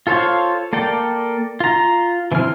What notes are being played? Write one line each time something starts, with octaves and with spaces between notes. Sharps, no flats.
F4 A4 C5 C#5 F5
A#3 A4 D5 G5
F4 A#5
E3 F3 C4 E4 F6